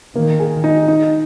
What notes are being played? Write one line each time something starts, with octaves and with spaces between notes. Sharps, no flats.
D#3 A#3
G#4
D#4
D#4